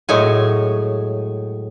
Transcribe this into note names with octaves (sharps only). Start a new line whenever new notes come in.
A2 F#3 G#3 C#5 G#5